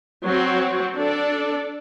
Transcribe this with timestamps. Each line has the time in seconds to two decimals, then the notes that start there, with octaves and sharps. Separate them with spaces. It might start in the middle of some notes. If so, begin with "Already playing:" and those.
0.25 F#3 C4 F#4
0.96 D4 A4 D5